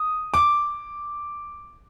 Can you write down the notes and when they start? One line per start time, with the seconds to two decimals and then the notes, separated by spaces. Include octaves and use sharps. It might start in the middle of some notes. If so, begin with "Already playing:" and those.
Already playing: D#6
0.34 D6